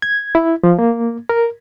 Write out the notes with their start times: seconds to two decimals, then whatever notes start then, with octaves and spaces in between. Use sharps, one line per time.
0.02 G#6
0.35 E4
0.63 F3
0.79 A#3
1.29 A#4